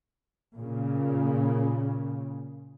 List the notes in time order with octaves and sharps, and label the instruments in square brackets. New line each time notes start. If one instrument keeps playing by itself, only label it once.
[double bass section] A#2 C#3